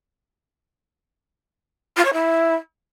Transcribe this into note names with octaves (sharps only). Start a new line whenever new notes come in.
F4
C#5
E4